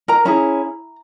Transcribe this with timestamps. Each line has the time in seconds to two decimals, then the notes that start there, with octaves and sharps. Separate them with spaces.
0.08 A#4 A#5
0.25 C#4 E4 G#4 A#5